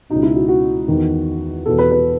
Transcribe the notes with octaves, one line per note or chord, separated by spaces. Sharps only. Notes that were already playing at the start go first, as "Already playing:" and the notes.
B2 D#4
C#2
E4
F#4
F#4
E2 D#3
E2 B2 A4
B4
B4